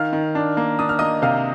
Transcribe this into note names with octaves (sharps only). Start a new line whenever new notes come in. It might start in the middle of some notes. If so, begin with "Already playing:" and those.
Already playing: D#3 F5 F6
D#3
D4
A#3
D4 D#6
F6
A#3 D#5 D#6
C3 F5 F6